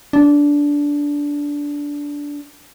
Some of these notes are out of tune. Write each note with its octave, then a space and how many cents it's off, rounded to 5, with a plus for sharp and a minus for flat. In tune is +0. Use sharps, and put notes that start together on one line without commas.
D4 -15